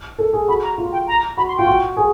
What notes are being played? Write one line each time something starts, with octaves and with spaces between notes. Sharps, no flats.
A4
G#4
F#4 B5
A#5
F4
G5
A#5
F#4 B5
C6
F4 G5
F#4
G#4